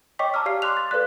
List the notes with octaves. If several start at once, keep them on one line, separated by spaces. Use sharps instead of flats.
C#5 D#5 G5 C#6 D6 B6
A5 A#5 D6 E6 F6
G4 D5 F5 F6 C7
C6 D6 F#6 F7
A6
A4 B4 D5 F5 F#6